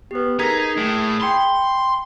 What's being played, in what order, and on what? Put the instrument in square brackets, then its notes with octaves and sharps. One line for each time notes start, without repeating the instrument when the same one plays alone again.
[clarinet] B3 [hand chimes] G4 B4
[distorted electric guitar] D#4 [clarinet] G#4 [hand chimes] A#4 G#6 B6
[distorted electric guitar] A2
[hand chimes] G5 B5 [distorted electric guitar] C6